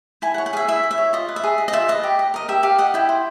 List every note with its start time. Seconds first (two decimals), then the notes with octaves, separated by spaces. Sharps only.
0.22 E4 G#5
0.34 F#5
0.38 C#5
0.46 F#5
0.53 G#4 F5
0.57 E5
0.68 E4 E5
0.84 E4
0.91 E5
0.98 C#5
1.13 F4 D#5
1.29 B4
1.36 E5
1.44 G#4
1.58 D#5
1.68 D#5
1.73 F4 E5
1.88 B4 D#5
2.03 G4
2.19 D#5
2.34 A#4 D#5
2.48 G4 E5
2.63 G4 F5
2.78 D#5 F#5
2.94 E4 G5
3.09 C5